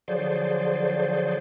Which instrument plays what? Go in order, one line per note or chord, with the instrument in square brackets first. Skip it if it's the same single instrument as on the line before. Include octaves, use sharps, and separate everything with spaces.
[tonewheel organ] D3 F3 F#3 G#4 C5 D5